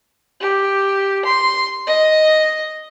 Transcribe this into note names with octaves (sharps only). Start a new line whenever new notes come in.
G4
C6
D#5